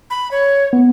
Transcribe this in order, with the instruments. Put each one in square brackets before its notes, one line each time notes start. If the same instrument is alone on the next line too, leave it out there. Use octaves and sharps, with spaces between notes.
[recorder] B5
C#5
[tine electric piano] B3